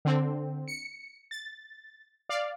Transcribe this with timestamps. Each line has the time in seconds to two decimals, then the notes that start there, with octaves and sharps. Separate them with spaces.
0.05 D3 C4
0.68 C#7
1.31 A6
2.29 D5 F5